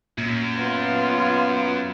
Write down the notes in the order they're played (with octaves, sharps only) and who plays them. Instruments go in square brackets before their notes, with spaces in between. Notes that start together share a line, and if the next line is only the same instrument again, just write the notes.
[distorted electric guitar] F#2 [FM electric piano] A#2
[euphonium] B3 [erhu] F4